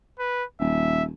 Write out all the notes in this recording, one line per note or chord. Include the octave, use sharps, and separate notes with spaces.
B4
D#1 E5